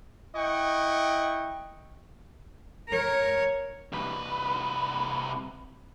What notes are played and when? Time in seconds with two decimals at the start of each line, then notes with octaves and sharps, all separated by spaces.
0.36 E4 D#5 F#5 G5 C#6
2.89 A#4 C#5
3.92 C2 B4